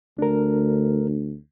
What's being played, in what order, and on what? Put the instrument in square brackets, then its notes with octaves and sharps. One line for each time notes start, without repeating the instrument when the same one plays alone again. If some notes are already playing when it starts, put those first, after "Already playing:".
[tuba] D2 [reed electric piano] D4 A#4